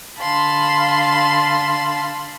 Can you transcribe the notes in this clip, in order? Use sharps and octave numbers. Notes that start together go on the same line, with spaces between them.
D3 F5 A5 B5 C6